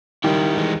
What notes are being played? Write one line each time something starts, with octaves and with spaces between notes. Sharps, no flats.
D#3 G3 E4 G4
E3 G#3